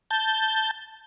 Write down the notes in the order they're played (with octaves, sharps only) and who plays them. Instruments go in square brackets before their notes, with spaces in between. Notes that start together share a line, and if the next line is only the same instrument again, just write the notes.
[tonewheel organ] A5 G6